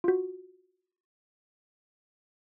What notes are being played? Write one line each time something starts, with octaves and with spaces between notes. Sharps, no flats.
F4 F#4